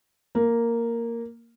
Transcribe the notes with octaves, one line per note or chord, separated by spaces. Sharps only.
A#3